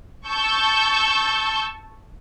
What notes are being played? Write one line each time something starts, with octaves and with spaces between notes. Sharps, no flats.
A5 C#6 E6 G6